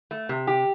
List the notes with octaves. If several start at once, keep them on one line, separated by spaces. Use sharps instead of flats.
A3
C3
G4